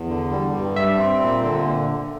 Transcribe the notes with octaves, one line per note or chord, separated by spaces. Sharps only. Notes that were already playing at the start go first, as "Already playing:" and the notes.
Already playing: E2
D3
G3
G2
G3 E5
C4
A#2
D3